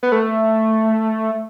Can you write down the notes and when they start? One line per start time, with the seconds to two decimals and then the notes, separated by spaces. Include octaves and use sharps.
0.03 B3
0.12 A3